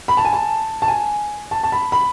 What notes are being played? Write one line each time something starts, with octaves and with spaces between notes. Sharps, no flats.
B5
A5
G#5
A5
A5
G#5
A5
A5
B5
B5